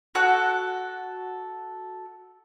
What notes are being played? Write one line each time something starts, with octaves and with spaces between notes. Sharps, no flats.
F#4 A4 F#6